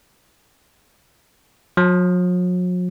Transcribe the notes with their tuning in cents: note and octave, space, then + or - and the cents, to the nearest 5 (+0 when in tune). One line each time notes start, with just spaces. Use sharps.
F#3 -45